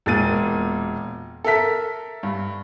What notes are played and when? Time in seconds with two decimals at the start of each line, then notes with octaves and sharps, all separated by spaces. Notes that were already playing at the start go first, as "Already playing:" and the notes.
0.06 E1 A#2 A6 D#7
1.44 A4 A#4 E5 B6
2.23 G2